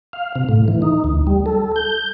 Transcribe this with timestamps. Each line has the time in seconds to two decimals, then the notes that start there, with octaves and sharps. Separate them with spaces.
0.13 F5
0.35 C3
0.49 A2
0.68 E3
0.82 D#4
1.04 D2
1.27 G3
1.46 A4
1.76 G6